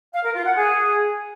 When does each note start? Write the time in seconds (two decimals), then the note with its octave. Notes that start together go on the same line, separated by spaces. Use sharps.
0.14 F5
0.25 A#4
0.35 F4
0.46 F#5
0.56 G#4